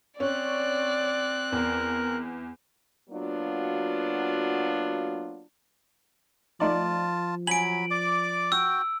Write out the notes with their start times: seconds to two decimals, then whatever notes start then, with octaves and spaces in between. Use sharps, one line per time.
0.20 C4 C#4 D5 F#6
1.52 E2 A#4
3.09 F#3 A#3 B3 D4 F4 F#4
6.60 F3 A3 D#4 F4 D5 A5
7.47 F#3 G#5 B5 D7 F#7
7.91 D5 D6
8.52 F#4 G5 E6